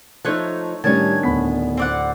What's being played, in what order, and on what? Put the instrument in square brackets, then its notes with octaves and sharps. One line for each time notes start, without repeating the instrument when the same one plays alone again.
[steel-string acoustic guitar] F3 D#4 [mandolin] A3 C#5 F#6
[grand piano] A2 G3 [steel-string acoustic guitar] D#3 C#4 D4 [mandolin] C#5 A5 [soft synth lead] G#6
[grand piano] D1 B5 B6 [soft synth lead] B3
[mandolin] C4 D5 F#5